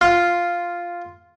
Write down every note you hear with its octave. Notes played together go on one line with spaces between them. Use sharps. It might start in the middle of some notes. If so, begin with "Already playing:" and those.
F4